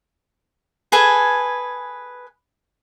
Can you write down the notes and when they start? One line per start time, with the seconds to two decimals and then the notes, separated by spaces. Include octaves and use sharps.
0.92 G#4 A4 B4 G#5